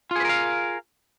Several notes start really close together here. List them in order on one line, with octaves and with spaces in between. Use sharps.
F4 G#4 B4 A#4 F5